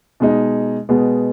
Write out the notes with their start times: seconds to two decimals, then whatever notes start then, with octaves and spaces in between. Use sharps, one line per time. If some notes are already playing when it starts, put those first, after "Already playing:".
0.20 B2 G#3 D#4
0.89 B2 G#3 B3